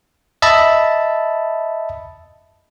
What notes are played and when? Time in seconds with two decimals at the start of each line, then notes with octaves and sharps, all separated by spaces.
0.42 D#5 E5 A5 B5